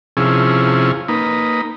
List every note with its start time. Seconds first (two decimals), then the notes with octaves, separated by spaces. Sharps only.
0.17 C3 F3 C#4 E4 G#4
1.08 A#3 D#4 B4